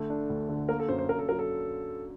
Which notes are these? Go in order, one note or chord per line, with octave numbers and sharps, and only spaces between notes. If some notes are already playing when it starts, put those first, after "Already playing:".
Already playing: D3 A3
D4
D2
D3
A#3 A#4
A4
F#2 C5
C5
F#2 A#4
A4
F#3 A#4
A4